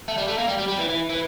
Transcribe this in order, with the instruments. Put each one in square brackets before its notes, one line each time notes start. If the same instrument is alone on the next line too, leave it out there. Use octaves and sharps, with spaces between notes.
[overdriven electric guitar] A3
G3
A3
A#3
G3
G3
G3
E3
E3
E3